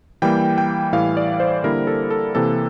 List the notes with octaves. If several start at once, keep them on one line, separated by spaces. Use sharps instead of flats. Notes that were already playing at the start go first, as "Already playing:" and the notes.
E3 G3 A#3 G5
G5
A2 E3 G3 F5
D5
C5
D3 G3 A#3 E4 A#4
A4
A4
C3 E3 A#3 A4